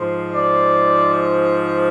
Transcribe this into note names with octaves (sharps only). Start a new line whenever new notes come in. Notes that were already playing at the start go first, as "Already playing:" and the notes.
Already playing: G#2 F3
D5